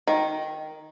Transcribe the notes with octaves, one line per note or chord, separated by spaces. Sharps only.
D#3